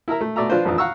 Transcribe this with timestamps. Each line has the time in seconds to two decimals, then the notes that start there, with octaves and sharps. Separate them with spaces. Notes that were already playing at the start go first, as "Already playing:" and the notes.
0.08 E4 A#4 E5 A#5
0.21 A3
0.36 B2 A3 D5 E5 A#5
0.50 F3 D4 F4 B4 C5
0.65 A1 F2 E3 F3 D4 D#6
0.78 F5 F#5 A#5 C#6 E6